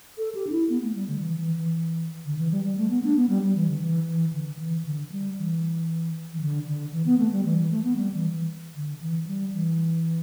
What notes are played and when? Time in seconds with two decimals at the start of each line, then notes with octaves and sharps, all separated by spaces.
0.18 A4
0.35 G4
0.47 D4
0.52 E4
0.69 B3
0.83 A3
0.95 G3
1.08 D3
1.21 E3
1.39 E3
1.56 E3
2.25 D3
2.39 E3
2.52 G3
2.64 G3
2.78 A3
2.90 B3
3.04 D4
3.16 B3
3.29 G3
3.42 G3
3.55 E3
3.68 D3
3.82 E3
4.07 E3
4.33 D3
4.59 E3
4.85 D3
5.12 G3
5.38 E3
6.34 E3
6.41 D3
6.67 D3
6.93 E3
7.06 B3
7.19 A3
7.32 G3
7.45 E3
7.58 E3
7.71 A3
7.84 B3
7.97 G3
8.14 E3
8.32 E3
8.75 D3
9.01 E3
9.27 G3
9.53 E3